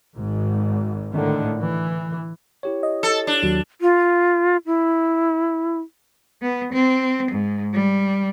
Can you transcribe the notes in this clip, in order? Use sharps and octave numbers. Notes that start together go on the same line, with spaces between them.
G#1 G#2
A2 D3 D#3
E3
E4 G4 C#5
D#5
A4
D4
D#2 F#3
F4
E4
B3
C4
G#2
G3